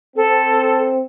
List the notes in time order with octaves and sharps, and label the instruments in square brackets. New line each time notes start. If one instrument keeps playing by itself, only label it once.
[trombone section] C4 [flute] A4